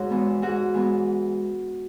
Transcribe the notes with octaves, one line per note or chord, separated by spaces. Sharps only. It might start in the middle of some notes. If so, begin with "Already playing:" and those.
Already playing: G#2 F#4 C#5
E3 G#3 B3
G#2 F#4
E3 G#3 B3